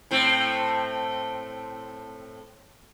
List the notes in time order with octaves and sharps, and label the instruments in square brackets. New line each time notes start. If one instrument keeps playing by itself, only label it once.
[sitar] A2 A3 C4